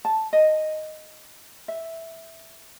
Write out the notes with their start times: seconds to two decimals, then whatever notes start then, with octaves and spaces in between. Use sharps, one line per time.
0.05 A5
0.33 D#5
1.68 E5